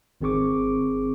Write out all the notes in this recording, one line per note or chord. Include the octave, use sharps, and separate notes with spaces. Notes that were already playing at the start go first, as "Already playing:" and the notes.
G#1 D#3 C4 G#4 C#6 D6